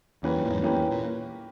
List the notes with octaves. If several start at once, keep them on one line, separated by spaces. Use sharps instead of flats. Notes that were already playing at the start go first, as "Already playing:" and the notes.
E2 E3 A#3 C#4 G4 B4
G2
A#2
E2 G#2
G2 E3 A#3 C#4 G4 B4
E2
A#2